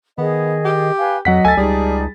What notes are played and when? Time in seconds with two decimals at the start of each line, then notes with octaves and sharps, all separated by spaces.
0.18 D#3 B3 G#4 D#5
0.65 G4
0.98 B4 F5 G#5
1.25 F2 F#3 D#5 F#5 B6
1.45 D2 A4 G#5 A6
1.57 C#2 G3 D#4 G#4 D5 A5